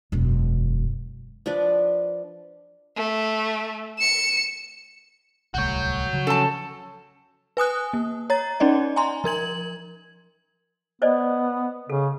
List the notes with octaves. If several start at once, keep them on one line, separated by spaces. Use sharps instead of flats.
E1 F#2
F3 D4 B4 D5
A3
C#7 E7
D1 C2 A3 F#4 C#5 G6
C#3 F3 F#3
C#4 A4 A5
B4 G#5 D#6 F#6
A#3
C#5 A#5 A6
C#4 D#4 D5 D#5
G#5 A#5 C6
F3 A#4 G#6 F#7
B3 C5 D5 D#5
C#3 A4